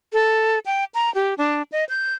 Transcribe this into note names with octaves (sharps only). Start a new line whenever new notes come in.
A4
G5
A#5
G4
D4
D#5
G6